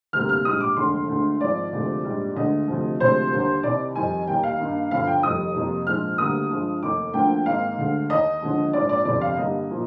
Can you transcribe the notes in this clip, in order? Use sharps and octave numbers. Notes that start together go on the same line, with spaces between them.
D2 C3 G3 A#3 F6
F6
A#1 G#2 G3 D#6
D6
F1 D#2 D3 G#3 C6
D2 D3 G#3
G#1 G#2 F3 D5
D2 C3 F3 G#3
A#1 G#2 G3
D2 D3 G#3 D#5
D2 C3 F3
D2 C3 F3 G#3 C5
D#2 D3 G3 A#3
C2 C3 D#3 D5
F2 D#3 G3 G#5
D#2 D#3 G3 A#3 G5
F5
G2 D#3 A#3
G1 G2 F3 F5
G5
F1 F2 D#3 G3 D#6
F2 C3 G3 A#3
A#1 G#2 F3 G#3 F6
D2 D3 G3 A#3 D#6
G2 F3 G#3
F1 D#2 D#3 D6
D2 D3 F3 A#3 G5
G#1 G#2 D#3 A#3 F5
D2 D3 G#3
D#2 D#3 A#3 D#5
D#2 D3 F3 G#3
A#1 G#2 F3 D5
D5
G1 F2 C3 D5
F5
G2 D3 G3 A#3 D#5
A#2 F3 A#3